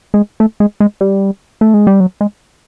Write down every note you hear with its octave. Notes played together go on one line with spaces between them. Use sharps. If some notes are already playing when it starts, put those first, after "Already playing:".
G#3
A3
G#3
G#3
G3
A3
G#3
G3
F#3
G#3